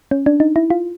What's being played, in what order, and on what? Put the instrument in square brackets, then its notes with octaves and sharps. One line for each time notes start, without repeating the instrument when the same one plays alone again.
[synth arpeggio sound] C#4
D4
D#4
E4
F4